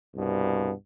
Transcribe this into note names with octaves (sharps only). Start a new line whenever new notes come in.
C2 G2 B2